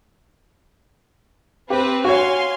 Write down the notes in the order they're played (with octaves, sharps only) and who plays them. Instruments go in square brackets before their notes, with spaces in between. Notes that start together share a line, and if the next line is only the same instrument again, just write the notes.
[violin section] C4 B4 [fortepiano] G4
[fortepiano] F#4 C#5 [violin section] F5 G#5 C6